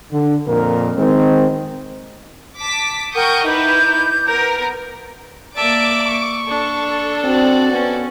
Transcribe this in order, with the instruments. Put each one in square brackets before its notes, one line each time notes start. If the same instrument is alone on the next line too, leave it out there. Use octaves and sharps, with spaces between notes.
[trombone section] D3
F2 A#2 A#4
D#3 G#3 C4
[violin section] A5 D6 B6
[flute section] A#4 F#5 G5 [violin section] C#6 D#6 G6
[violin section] D#4 E4 B4 [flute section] D6 G6
[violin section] B3 A#4
[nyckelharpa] A#3 E5 [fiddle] D5 A5 [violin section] D6 D7
[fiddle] C#6
[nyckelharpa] D4 [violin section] A4
[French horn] C4 [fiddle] F#4 D5
[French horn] B3 [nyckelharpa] C#4